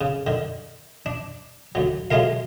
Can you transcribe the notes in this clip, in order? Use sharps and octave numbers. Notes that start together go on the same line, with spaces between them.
C#3
D3 D#3
D4
D2 F#3
F#3 G#3 A3 F4 A#4 F5